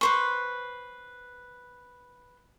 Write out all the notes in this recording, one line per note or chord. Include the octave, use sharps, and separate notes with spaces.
B4 C5 C#6